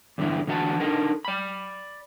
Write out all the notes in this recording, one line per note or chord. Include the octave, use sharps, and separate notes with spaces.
E2 G2 D3 E3 E4
D3 E3 F#4 E5 F#5 A5
D4 D#4 A4 A#4
D5 B5